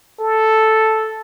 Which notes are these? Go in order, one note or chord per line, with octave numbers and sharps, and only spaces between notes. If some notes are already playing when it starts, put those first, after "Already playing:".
A4